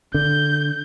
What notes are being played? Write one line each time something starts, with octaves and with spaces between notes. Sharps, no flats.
D3 G6